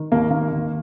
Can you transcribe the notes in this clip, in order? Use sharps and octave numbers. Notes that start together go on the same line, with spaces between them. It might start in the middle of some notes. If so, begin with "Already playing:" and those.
Already playing: D#3
D#2 A#3
D#3 A#3
D#2